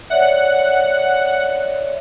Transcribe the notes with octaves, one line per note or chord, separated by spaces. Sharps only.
C#5 D5 E5 F#5